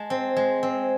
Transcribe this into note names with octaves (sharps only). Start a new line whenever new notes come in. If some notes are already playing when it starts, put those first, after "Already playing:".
Already playing: G#3 A5
C4
G#3
C4